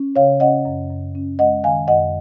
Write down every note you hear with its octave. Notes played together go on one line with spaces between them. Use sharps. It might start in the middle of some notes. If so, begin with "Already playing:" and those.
Already playing: C#4
C#3 C#5 F5
C#4 D#5 F#5
F#2
F#2
C#4
G#3 D#5 F#5
D#3 F5 G#5
F#2 D#5 F#5